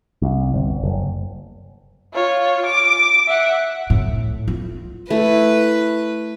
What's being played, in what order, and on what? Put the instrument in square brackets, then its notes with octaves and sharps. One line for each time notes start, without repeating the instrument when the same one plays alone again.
[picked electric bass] C2
G1
F#1
[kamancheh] F4 C#5
D6
E5 F#5
[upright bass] A2
F4
[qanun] A3 E4 [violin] B4